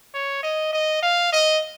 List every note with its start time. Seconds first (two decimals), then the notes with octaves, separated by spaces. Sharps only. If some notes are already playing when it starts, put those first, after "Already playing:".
0.14 C#5
0.43 D#5
0.73 D#5
1.03 F5
1.33 D#5